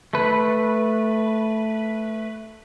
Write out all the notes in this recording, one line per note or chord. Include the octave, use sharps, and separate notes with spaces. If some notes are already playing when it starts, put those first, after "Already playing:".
A3 B4